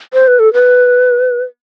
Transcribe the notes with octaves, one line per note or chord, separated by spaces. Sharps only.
C5
B4
A4
B4